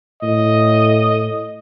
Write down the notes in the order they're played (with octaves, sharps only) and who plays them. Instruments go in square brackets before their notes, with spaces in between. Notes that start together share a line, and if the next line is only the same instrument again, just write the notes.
[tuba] A2 [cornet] D#5